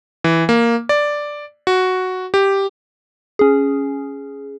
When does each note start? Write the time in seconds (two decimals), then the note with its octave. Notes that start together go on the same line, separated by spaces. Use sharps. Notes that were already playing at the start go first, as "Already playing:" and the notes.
0.24 E3
0.49 A#3
0.89 D5
1.67 F#4
2.34 G4
3.39 C#4 G#4